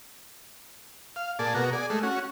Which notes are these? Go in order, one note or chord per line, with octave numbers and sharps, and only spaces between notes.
F5
A#2 G#4 D5 A5
B2 F#4 A#4
G#4 D5
G#3 A3
C#4 F#4